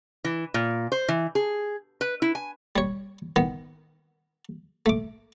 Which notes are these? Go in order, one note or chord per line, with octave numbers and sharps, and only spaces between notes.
E3
A#2
C5
E3
G#4
B4
E4
G#5
G3 C#5
D#3 B3
A3 D6